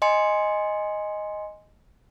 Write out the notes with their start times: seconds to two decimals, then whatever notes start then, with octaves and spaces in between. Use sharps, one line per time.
0.02 D#5 G#5 C6 C#7